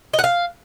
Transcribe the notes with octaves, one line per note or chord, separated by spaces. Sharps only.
D#5
F#5
F5